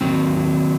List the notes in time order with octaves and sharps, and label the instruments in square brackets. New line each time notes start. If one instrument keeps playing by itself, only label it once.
[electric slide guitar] D#3 F#3 C4